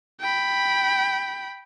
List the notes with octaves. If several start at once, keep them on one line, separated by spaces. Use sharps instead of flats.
G5 B5